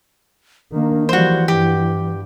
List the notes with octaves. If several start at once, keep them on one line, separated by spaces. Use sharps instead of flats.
D#3 A#3 D4
E3 F3 G3 F#4 C5
G2 G4